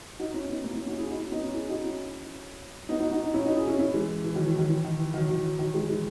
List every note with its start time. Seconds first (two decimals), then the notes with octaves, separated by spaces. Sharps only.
0.19 D#4 F#4
0.34 C#4 E4
0.49 B3 D#4
0.64 A#3 C#4
0.75 C#4 E4
0.87 D#4 F#4
0.98 E4 G#4
1.09 D#4 F#4
1.20 C#4 E4
1.32 B3 D#4
1.43 C#4 E4
1.54 E4 G#4
1.69 D#4 F#4
1.84 C#4 E4
2.89 B3 D#4
3.00 D#4 F#4
3.11 D#4 F#4
3.23 D#4 F#4
3.34 C#4 E4
3.45 D#4 F#4
3.57 E4 G#4
3.68 C#4 E4
3.79 C#4 E4
3.94 E3 G#3
4.24 E3
4.35 D#3 F#3
4.46 E3
4.58 D#3 F#3
4.69 E3
4.84 D#3
4.99 E3
5.14 D#3 F#3
5.29 D#3 F#3
5.44 E3
5.59 D#3 F#3
5.74 E3 G#3
5.89 E3 G#3